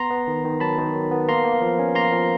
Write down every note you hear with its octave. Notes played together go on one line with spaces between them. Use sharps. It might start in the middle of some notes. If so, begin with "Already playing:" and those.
Already playing: B3 A#5 C6
B3
D#3
D#3
F#3 A5 B5
D#3
F#3
B3
A#3 A#5 C6
A#3
F3
C#4
A#3 A#5 C6
F3